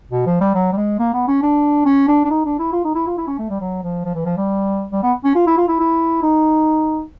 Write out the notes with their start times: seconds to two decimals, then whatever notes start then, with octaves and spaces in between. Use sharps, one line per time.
0.12 B2
0.26 F3
0.41 G3
0.55 F#3
0.72 G3
0.77 G#3
0.99 A#3
1.14 B3
1.28 C#4
1.43 D4
1.86 C#4
2.08 D4
2.25 D4
2.30 D#4
2.45 D4
2.59 E4
2.73 F4
2.85 D#4
2.95 E4
3.07 F4
3.18 E4
3.28 C#4
3.38 A3
3.50 G3
3.61 F#3
3.83 F3
4.05 F3
4.15 E3
4.26 F3
4.37 G3
4.92 G3
5.03 B3
5.25 C#4
5.35 F4
5.47 E4
5.58 F4
5.68 E4
5.80 E4
6.23 D#4